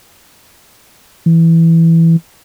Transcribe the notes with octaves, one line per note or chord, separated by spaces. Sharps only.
E3